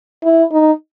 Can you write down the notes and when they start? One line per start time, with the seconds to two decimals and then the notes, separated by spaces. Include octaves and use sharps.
0.24 E4
0.52 D#4